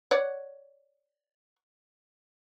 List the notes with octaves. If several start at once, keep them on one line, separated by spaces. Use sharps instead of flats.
C#5 D5 F#5